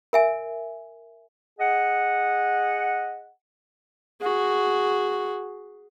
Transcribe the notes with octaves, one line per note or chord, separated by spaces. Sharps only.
A#4 E5 G#5
G#4 D#5 F#5
F#4 G#4